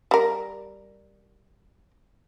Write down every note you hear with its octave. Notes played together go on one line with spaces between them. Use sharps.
G3 A#4